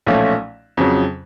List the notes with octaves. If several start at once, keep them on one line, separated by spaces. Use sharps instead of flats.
B1 A#2 F3 A3 C#4
F2 C#3 F#3